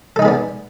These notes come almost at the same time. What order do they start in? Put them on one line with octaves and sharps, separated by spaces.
A4 D#4 G#4 B3 D4